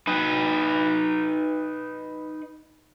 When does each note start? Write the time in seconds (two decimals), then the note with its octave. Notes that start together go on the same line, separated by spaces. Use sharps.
0.07 D#4 B4